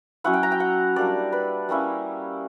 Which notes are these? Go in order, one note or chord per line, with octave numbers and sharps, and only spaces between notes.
F#3 C#4 E4 F#5
G5
A#5
G5
F#5
G3 A#3 D4 D5
B4
G3 A#3 C#4 E4